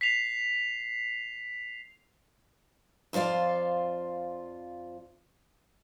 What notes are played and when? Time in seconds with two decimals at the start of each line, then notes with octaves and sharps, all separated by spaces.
0.01 B6 C7 F7
3.13 F2 F4 C5 D5 F5